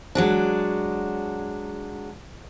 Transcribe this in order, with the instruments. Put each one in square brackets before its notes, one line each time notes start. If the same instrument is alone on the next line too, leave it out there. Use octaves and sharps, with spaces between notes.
[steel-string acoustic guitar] F#3 G#3 D4